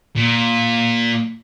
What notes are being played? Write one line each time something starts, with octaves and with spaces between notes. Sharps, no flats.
A#2